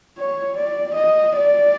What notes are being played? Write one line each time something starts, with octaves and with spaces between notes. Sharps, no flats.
C#5
D5
D#5
D5